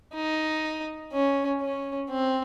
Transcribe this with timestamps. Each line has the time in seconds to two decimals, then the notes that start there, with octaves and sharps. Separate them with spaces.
0.14 D#4
1.12 C#4
1.61 C#4
2.10 C4